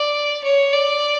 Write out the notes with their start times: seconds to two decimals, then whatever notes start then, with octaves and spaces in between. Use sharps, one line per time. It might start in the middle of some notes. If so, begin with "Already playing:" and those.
Already playing: D5
0.44 C#5
0.73 D5